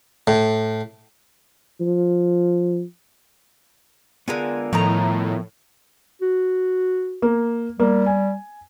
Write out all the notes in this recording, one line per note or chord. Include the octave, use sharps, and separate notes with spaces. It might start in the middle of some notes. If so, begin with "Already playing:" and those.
A2
F3
D3 G#3 B3 F4 A#4 G#5
A2 D#3 F3 D#5 A#5
F#4
A#3
G3 A#3
G#5